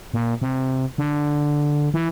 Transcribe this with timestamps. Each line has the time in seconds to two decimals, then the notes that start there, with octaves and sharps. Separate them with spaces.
0.14 A#2
0.42 C3
0.98 D3
1.94 E3